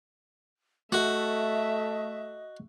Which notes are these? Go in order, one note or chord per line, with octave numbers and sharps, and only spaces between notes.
A3 F#4 D#5 E5